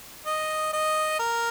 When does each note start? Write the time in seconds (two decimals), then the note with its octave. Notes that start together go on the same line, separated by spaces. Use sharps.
0.26 D#5
0.73 D#5
1.20 A#4